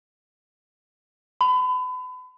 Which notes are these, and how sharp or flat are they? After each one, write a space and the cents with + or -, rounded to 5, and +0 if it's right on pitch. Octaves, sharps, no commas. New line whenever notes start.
B5 +35